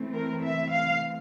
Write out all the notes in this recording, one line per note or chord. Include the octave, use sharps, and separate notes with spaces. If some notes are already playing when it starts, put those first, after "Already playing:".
Already playing: E3 A3 C4
A#4
E5
F5